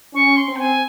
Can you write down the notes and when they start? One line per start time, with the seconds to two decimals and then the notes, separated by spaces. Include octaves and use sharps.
0.14 C#4 C#6
0.37 C6
0.48 C4
0.56 G5
0.60 G#5